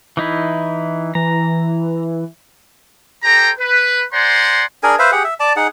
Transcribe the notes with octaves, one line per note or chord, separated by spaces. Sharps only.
E3 D#4 E4
E3 A#5
G4 A4 C5 G5 A#5
B4
C5 D5 F#5 G#5 A#5 C6
D4 G#4 A#4 G#5
B4 C5 E5 F5
G4 G#4 F#5
E5
D5 A5
D#4 G#4 F#5